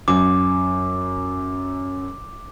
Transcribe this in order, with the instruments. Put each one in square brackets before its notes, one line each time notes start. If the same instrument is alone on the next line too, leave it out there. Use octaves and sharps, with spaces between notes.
[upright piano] F#2 [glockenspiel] D6